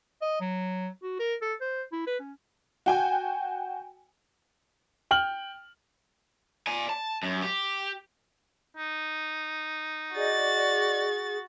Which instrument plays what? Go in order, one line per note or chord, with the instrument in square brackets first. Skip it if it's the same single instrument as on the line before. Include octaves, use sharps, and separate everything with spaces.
[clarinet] D#5
F#3
F#4
A#4
A4
C5
E4
B4
C#4
[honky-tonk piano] F#4 G5 G#5
[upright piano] G5 F6 F#7
[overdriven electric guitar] D5 G#5
A5
F#2
G4
[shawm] D#4
[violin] F#4 A6 [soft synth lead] G#4 [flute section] D5 D#5